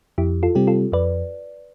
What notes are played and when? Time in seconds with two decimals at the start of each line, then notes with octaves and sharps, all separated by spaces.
0.18 F2 E4 G4
0.43 F4 A4
0.55 C3 G3 C4 G4
0.67 F4 A4
0.92 F2 B4 D5